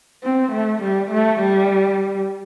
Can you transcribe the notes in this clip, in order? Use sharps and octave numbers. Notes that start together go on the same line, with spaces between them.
C4
A3
G3
A3
G3